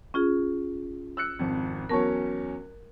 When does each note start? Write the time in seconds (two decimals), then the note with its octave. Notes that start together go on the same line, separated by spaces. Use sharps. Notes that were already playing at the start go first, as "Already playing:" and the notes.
0.14 C#4 F4 G#4
1.17 E6 F#6 C#7
1.39 G#1 F2
1.89 E2 F#3 C#4 A#4 A5 C#6